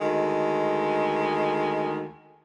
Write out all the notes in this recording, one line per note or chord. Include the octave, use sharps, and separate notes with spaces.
D2 D#3 G#3